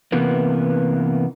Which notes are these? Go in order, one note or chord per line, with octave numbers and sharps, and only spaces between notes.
C3 E3 A#3 B3